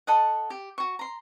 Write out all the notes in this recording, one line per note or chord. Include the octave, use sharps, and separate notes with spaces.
A4 D#5 F#5
G4
F#4 C#6
A#5 C6